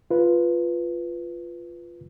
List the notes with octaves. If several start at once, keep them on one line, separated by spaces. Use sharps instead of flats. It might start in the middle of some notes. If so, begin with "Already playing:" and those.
F4 B4